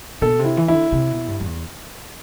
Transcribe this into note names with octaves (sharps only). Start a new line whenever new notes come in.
B2 A4
C3
E4
E3
E4
D3
C3
B2
G2
F#2
E2